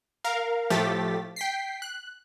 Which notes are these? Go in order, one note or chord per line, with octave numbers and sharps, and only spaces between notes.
A#4 F5
A2 F3 A3 G4 A6 B6
G5 B6 C7
F#6